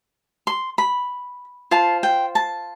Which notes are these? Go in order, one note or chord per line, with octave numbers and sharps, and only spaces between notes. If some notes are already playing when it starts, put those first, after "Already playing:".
C6
B5
F4 C5 A5
G5
A5